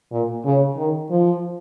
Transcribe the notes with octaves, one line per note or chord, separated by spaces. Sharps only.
A#2
C#3
D#3
F3